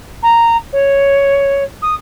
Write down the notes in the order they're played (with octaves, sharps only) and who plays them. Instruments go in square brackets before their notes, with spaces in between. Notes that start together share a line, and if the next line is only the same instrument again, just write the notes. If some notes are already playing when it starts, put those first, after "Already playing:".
[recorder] A#5
C#5
D#6